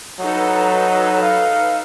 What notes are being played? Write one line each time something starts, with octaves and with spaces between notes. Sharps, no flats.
F#3 D#4 A4 B4
F5